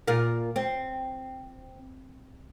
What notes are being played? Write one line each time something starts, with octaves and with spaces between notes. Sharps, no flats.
A#2 F4 A#4
C4